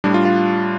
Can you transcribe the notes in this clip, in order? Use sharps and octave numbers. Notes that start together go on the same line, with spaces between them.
A2 G3 D4
F4
F4